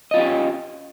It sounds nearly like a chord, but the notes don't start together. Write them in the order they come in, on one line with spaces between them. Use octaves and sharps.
D#5 F4 C#4 G4